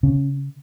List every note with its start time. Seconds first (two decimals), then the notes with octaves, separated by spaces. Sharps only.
0.03 C#3 C#4